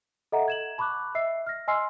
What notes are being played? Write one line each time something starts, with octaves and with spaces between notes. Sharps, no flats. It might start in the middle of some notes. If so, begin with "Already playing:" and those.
A4 D#5 E5 F#5 A#5
G#6 E7 F#7
A5 B5 C#6 D6 F#6
D#5 E5 E6 C7
F6 A#6
D#5 G#5 C6 E6 F6 C7